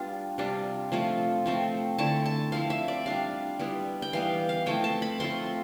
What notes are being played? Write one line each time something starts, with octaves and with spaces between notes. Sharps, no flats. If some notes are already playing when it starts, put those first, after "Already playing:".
Already playing: G3 B3 D4 F4
C3 G3 D4 F4
F3 A3 C4 F4
F3 A3 C4
D3 A3 E4 A5
A5
F3 C4 E4 F5
E5
D5
G3 D4 F4 F5
G3 B3 E4
G5
E3 G3 B3 F5
F5
F3 A3 C4 E4 G5
A5
B5
F3 A3 C4 F4 C6